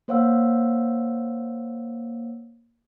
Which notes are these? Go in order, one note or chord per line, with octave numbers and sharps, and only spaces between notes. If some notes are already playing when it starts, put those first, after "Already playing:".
A#3 C5 C#5 F5 F#5 E6